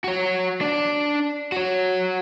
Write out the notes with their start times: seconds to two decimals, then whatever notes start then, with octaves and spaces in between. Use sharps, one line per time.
0.04 F#4 C#5
0.61 D4 D5
1.52 F#4 C#5